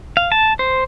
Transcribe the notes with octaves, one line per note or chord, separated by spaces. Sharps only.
F5
A5
C5